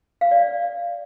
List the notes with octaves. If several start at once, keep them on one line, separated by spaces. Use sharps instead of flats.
F5
D5
D5